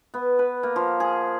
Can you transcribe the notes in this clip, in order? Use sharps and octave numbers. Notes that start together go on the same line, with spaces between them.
B3
B4
A#3
F3
G#4